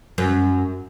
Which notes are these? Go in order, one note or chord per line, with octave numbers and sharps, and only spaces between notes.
F#2